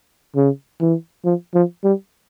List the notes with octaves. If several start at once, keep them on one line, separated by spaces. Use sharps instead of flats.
C#3
E3
F3
F3
G3